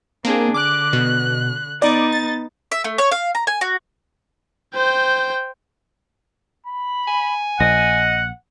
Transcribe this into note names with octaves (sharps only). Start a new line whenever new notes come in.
A#3 C4 D4 G#4
D3 D6 F#6
B2
B3 D#4 D5
A6
E5
A3
C#5
F5
A#5
G#5
F#4
C5 G5
B5
G#5
A#1 D#5 F#5